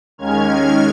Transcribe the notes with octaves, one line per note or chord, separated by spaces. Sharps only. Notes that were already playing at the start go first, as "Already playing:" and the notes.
D#2 D#3 G#3 C#4 F6 G#6